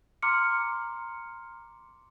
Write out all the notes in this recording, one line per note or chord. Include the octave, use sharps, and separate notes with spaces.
A#5 C6 D6 F6 C#7